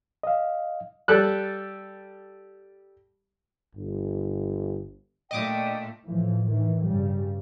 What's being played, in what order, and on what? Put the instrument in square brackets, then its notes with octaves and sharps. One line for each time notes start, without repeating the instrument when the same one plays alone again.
[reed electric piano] D#5 F5
[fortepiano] G3 A4 F#6
[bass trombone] G1
[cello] A#2 A3 [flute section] D4 G5 [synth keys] D#5 D6 D#6
[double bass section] A2 E3 F3
D#3 E3
G2 C#3 G3